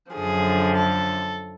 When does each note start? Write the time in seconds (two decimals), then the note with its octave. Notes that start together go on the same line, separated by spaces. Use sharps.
0.13 F#2 D3 F3 G#4
0.75 A4